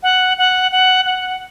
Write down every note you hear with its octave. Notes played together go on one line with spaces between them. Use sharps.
F#5
F#5
F#5
F#5